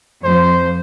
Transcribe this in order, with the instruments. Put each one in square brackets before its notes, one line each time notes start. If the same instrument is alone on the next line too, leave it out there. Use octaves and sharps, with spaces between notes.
[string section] F2 [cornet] C5